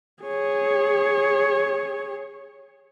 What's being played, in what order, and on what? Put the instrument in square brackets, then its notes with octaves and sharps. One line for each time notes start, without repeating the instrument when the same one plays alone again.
[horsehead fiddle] G#4 C#5